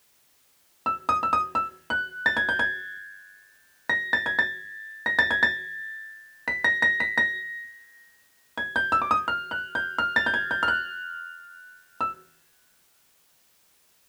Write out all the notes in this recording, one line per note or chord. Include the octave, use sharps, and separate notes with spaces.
E6
D#6
E6
D#6
E6
F#6
A6
G#6
G6
G#6
A#6
A6
G#6
A6
A#6
A6
G#6
A6
B6
A#6
A#6
B6
A#6
G#6
G6
E6
D6
D#6
F6
F#6
G6
F6
A6
G6
G#6
G6
F6
F#6
E6